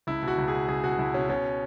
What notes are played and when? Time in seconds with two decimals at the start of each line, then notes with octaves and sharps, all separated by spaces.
0.07 C#2 E4
0.22 B2
0.28 F#4
0.38 C#2
0.48 B2 G#4
0.68 C#2 G#4
0.84 B2 F#4
0.99 C#2 E4
1.14 B2 C#4
1.29 B2 C#4